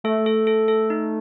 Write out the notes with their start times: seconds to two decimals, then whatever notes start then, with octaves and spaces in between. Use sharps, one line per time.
0.04 A3 A4
0.26 A4
0.47 A4
0.68 A4
0.90 D#4